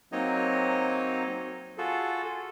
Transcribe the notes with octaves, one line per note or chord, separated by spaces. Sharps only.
F#3 A#3 C4 D#4 C#5 D#5
F4 F#4 G#4 A4